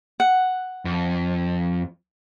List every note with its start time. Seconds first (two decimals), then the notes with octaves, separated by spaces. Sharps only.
0.20 F#5
0.85 F2